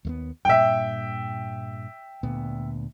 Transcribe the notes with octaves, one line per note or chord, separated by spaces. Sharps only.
D#2 A3 B3
G2 A#2 E5 G5
D2 A#2 B3